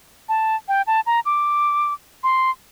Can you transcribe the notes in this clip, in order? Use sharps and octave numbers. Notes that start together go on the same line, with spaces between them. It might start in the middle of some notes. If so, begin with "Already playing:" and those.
A5
G5
A5
A#5
D6
C6